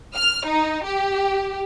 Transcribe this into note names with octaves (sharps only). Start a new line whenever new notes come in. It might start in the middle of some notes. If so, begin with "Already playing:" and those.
F6
D#4
G4